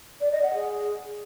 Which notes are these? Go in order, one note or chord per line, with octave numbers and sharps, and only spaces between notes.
D5
D#5
F#5
G#4